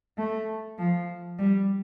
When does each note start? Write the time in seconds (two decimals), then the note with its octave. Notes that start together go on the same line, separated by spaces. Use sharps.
0.18 A3
0.78 F3
1.39 G3